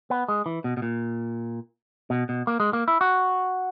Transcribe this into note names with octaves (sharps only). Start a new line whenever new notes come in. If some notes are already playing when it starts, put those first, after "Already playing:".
B3
G#3
E3
B2
B2
A#2
B2
B2
A#3
G#3
A#3
E4
F#4